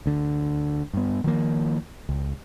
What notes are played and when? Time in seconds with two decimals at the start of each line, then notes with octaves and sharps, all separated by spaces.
0.06 D2 D3
0.94 G2 B3
1.24 D#3 F3 A#3
2.09 C#2